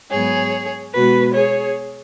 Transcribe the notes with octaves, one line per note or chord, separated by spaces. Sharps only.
G#2 F#3 B3 G#4 C#5
B2 G#3 B3 F#4 B4
G#4 C#5